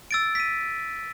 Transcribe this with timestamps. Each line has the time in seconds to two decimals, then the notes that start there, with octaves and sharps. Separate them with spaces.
0.11 E6 A6 D7
0.35 B6 D#7